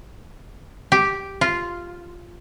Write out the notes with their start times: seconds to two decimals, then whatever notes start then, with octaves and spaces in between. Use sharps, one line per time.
0.92 G4
1.41 F4